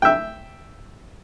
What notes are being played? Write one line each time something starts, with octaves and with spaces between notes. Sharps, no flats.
E5 G5